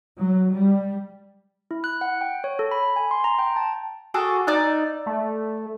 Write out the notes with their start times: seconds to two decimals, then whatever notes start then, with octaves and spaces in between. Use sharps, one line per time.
0.18 F#3
0.55 G3
1.71 E4
1.84 F#6
2.01 F#5
2.21 G5
2.44 C#5
2.59 A4
2.71 B5
2.96 G#5
3.11 C6
3.24 A#5
3.39 G5
3.56 A5
4.14 F#4 G#4 A4 D6
4.47 D#4 D5 E5 F#6
5.06 A3